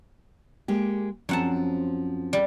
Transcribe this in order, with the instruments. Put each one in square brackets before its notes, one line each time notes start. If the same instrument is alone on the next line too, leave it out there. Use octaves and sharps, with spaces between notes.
[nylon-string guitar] G#3 A#3 G4
[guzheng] F#2 F#5 A5 [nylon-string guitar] F3 C4
[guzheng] G3